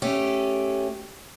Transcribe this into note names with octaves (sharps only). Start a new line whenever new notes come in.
A3 C#4 G4